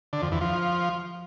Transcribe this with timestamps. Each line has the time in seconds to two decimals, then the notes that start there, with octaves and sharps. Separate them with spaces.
0.13 D3
0.22 F2
0.32 E2
0.41 F3